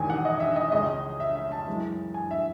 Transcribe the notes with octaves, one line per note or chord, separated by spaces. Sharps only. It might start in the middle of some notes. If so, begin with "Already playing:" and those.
Already playing: E1 E2 D#3 G#5
F#5
D#5
E5
D#5
C#2 C#3 G#3 C#4 D#5
E5
E5
A5
F#2 E3 G#3
G#5
E5